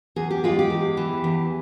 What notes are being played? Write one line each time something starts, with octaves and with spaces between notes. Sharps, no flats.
E2 G#4
G4
G#3 F4
G4
E2
E3
E2